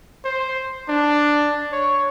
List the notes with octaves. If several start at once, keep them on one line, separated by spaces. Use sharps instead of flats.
C5
D4
C#5